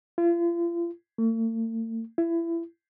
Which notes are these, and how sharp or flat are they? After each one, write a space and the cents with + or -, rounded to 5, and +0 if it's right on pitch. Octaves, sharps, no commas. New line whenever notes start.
F4 -40
A3 +45
E4 +25